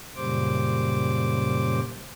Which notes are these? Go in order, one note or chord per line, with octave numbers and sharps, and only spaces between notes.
F#2 A#2 C#3 G3 C5 D6